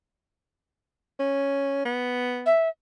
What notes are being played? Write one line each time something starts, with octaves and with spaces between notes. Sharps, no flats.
C#4
B3
E5